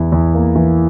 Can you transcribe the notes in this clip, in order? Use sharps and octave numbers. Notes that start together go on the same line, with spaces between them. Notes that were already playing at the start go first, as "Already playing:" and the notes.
Already playing: E2 E4
E2
A#3
E3